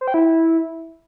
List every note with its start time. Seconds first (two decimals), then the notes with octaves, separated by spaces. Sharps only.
0.01 C5
0.08 G5
0.14 E4